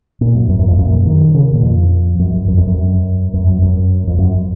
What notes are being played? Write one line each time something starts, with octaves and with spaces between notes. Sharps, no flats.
A#2
F#2
F#2
F#2
F2
F#2
A#2
F#2
D#3
C#3
A#2
F2
F#2
F#2
F#2
F2
F#2
F#2
F#2
F#2
F2
F#2